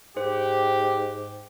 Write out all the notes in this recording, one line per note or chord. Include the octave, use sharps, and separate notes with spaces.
G#2 G4 C5